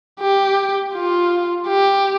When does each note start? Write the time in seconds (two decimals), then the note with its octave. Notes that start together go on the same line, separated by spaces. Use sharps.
0.20 G4
0.94 F4
1.68 G4